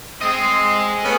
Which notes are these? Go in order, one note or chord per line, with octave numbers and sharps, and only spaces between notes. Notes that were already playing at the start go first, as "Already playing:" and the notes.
C4 G#4 D#5
A3 B3 C#4